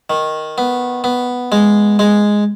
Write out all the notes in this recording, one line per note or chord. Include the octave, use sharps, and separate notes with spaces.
D#3
B3
B3
G#3
G#3